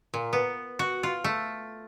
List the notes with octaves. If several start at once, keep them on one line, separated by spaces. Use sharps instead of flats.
A#2
B3
F#4
F4
A3